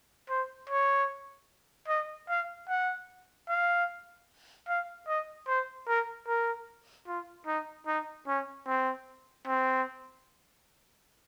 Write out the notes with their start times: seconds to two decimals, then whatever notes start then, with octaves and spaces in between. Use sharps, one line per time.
0.30 C5
0.69 C#5
1.89 D#5
2.29 F5
2.69 F#5
3.49 F5
4.68 F5
5.08 D#5
5.48 C5
5.88 A#4
6.28 A#4
7.08 F4
7.47 D#4
7.87 D#4
8.28 C#4
8.67 C4
9.47 C4